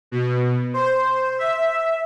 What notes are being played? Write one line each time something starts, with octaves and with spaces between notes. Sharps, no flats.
B2
C5
E5